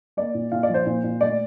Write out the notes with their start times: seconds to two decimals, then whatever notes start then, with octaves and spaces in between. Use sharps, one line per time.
0.17 A#3 D5
0.34 A#2
0.52 A#2 F5
0.63 D5
0.69 F3
0.74 C5
0.86 A#2
1.04 A#2
1.21 A3 D5